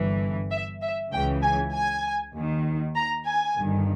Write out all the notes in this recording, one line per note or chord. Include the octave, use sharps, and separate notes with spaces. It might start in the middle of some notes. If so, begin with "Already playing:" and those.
Already playing: G1 G2 E3
E5
E5
C#2 C#3 E3 G5
G#5
G#5
D#2 D#3
A#5
G#5
G1 G2 D#3